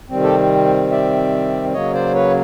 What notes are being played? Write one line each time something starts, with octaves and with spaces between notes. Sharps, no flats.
C3 D#3 G3 C4
G4 A4
D5 E5
C#3 F#3 A#3 C#5 D#5
C5 D5
B4 C#5